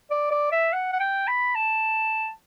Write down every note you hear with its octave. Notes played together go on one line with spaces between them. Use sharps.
D5
D5
E5
F#5
F#5
G5
B5
A5